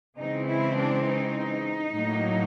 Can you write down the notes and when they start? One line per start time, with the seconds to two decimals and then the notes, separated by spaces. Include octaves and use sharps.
0.18 C#3 E3 G#3 C4 D#4
0.48 E4
0.77 D4
1.07 D#4
1.94 A2 F#3 A#3